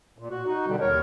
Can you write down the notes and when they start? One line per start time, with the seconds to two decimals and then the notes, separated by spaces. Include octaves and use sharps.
0.18 A#2
0.31 F#4
0.46 D#4 F#4
0.67 B2 D3 G3
0.81 D#2 A#4 C#5